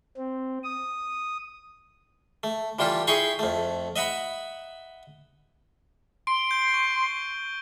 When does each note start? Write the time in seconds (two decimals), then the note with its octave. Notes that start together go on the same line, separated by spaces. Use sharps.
0.17 C4
0.64 D#6
2.43 A3
2.79 E3 G3 F4 G4 A4
3.07 E4 G#4 G5 A#5 C6 C#6
3.39 F2 A3
3.96 D#5 E5 F#5 A#5 B5
6.27 C6 D7
6.50 G6 D7 G7
6.74 C#6